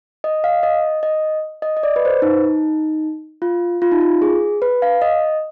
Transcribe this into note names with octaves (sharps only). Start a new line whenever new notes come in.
D#5
F5
D#5
D#5
D#5
D#5
D5
B4
C5
B4
D#4
F4
F4
D#4
F4
G#4
B4
F5
D#5